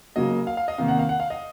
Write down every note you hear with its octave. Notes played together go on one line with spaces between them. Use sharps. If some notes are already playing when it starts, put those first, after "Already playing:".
C#3 F#3 A#3 D#5
F5
F5
D#5
C3 D#3 A#3 F5
F#5
F5
F#5
F5
D#5